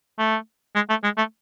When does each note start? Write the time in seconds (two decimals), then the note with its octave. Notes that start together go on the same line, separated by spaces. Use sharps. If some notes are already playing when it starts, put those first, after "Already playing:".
0.19 A3
0.75 G#3
0.89 A3
1.03 G#3
1.17 A3